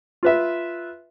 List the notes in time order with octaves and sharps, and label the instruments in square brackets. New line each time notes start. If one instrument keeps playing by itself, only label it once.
[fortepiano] F4 B4 E5